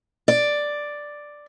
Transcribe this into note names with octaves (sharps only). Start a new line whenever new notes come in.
D5